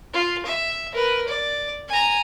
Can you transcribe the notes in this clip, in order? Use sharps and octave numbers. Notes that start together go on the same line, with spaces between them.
F4
E5
A#4 B4
D5
G#5 A#5